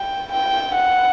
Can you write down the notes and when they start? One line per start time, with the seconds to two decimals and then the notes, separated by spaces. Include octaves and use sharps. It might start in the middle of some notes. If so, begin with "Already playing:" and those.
Already playing: G5
0.32 G5
0.75 F#5